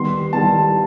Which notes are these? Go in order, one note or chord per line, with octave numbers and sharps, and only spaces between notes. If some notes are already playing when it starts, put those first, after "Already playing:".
Already playing: D#3 G3 B3 C6
D#3 G3 B3 A5